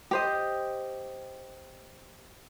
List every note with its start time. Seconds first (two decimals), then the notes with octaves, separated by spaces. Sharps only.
0.11 G4 C5 D#5